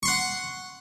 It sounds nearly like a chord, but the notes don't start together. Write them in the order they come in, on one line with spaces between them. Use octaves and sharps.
C#6 C6 F#5